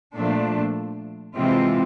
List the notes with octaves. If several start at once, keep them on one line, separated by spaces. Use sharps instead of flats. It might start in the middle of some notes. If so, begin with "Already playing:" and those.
A#2 F3 A3 D4
C3 E3 G#3 C4 F4